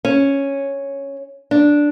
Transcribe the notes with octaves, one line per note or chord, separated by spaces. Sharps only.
C#4
D4